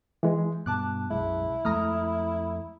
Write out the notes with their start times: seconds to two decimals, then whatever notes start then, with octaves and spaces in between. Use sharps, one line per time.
0.23 E3 G#3
0.66 G2 B2 A5 D6 F#6
1.10 B1 F#2 G#3 E4
1.65 F2 G#3 A3 A#5 D#6 F6